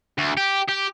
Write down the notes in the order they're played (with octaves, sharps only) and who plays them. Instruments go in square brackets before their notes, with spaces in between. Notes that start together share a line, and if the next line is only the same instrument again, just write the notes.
[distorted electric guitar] D2
G4
G4